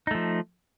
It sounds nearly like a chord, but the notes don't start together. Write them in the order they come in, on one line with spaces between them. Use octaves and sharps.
D#4 A3 F3